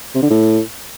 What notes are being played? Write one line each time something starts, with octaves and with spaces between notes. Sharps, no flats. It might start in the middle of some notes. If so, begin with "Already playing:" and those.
C3
D3
A2